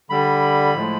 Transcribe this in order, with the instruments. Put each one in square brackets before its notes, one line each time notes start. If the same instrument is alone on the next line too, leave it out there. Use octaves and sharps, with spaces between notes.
[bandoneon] D3 G3 B5
A2 F3 G#3